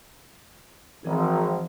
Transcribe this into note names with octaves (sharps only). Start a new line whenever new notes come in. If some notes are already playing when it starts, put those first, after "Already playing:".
G#1 E3 F3 C4